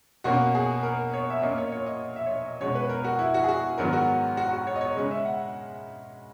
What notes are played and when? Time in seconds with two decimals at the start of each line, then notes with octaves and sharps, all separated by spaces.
0.24 B2 A#3 C#4 F#4
0.55 G#4
0.83 A#4
1.14 C#5
1.30 E5
1.42 A#2 A#3 C#4 D#5
1.58 C#5
1.67 D#5
1.72 C#5
1.86 D#5
2.16 E5
2.26 C#5
2.30 D#5
2.46 D#5
2.60 B2 G#3 C#4 C#5
2.75 B4
2.89 A#4
3.04 F#4
3.19 E4
3.34 F#4
3.44 G#4
3.48 F#4
3.78 G#2 D#3 F#3 B3 A#4
3.93 F#4
4.37 F#4
4.53 F#4
4.67 C#5
4.76 D#5
4.81 C#5
4.96 C#3 G#3 C#4 D#5
5.11 E5
5.25 F#5